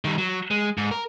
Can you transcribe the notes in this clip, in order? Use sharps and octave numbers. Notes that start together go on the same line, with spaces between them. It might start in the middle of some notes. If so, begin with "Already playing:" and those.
D#3 G3
F#3
G#3
G#2
A#4